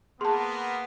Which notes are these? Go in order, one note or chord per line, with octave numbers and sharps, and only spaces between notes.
A#3 B3 G#4 A5 C6